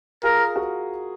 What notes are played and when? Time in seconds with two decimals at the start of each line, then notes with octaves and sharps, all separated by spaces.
0.23 F4 G#4 A#4
0.56 F#4 A#4